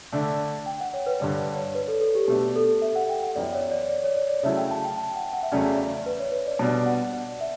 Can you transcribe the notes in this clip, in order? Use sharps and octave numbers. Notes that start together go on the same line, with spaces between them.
D3 A3 D4
G5
F#5
C#5
B4
G2 D3 G3 D5
C#5
B4
A4
A4
G4
B2 A3 D4 G4
A4
E5
F#5
G5
F#5
F#2 E3 B3 E4 D5
C#5
D5
D5
C#5
D5
D5
C#3 F#3 A3 E4 E5
G5
A5
G5
A5
F#5
F#5
E5
E2 C#3 F#3 A3 C#4 D5
E5
B4
C#5
B4
D5
B2 G3 D4 A5
F#5
D5
E5